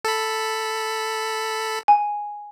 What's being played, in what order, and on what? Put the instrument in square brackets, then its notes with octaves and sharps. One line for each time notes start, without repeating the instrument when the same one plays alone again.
[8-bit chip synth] A4 B5
[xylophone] G#5